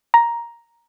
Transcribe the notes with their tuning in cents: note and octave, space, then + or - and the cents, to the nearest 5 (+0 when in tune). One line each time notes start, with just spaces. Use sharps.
A#5 +5